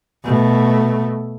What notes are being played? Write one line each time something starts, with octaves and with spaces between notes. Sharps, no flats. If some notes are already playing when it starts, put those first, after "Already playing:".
B2 A3